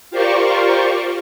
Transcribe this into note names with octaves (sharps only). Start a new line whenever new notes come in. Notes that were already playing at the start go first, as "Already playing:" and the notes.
F4 G4 A#4 C5 D5 C#6